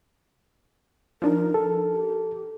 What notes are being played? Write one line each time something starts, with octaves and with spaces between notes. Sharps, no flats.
F3 D4 D#4 A#4
A4
G4